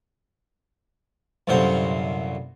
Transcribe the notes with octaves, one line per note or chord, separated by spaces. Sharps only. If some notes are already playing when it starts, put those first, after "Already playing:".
C2 F#2 A#2 D3 C5